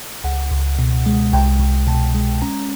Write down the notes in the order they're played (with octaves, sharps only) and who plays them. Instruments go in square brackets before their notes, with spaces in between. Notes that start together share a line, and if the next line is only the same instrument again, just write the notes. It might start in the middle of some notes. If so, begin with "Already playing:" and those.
[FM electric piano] C#2 F#5
C#2
B2
G#3
C2 G5
C2
B2 A5
G#3
C#4 A#5